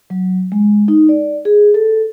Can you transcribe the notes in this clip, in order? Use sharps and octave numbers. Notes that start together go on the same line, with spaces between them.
F#3
G#3
D#4
D5
G#4
A4